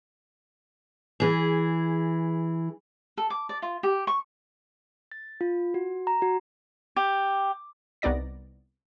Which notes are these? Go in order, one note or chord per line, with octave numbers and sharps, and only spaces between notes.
E3 G#4
A4
D6
D5
F4
G4
C#6
A6
F4
F#4
A#5
F#4
G4
C2 B3 D#4 D5 A#6